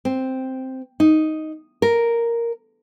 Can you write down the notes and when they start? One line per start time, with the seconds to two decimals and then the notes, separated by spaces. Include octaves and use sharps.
0.05 C4
1.00 D#4
1.82 A#4